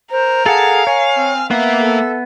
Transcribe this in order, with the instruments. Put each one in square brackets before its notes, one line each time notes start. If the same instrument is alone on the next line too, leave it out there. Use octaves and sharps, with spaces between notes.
[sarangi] A#4 [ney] C5
[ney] G#4 [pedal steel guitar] A4 F#5 A5 [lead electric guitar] F5
[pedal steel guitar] C#5 [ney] G#5
[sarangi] C4
[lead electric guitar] A#3 [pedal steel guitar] B3 [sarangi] E5
[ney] A4